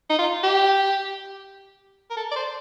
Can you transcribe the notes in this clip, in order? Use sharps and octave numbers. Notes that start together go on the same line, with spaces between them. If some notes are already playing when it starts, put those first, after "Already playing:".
D#4
F4
G4
A#4
A4
D5
C5